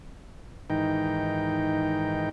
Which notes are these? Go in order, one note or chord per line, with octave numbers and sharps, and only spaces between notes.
G#2 D#3 E3 D#4 G5